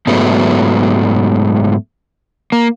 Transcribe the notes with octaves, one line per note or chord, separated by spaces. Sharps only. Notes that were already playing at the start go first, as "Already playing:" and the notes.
G#2 F#3 G#3 A3 B3
A#3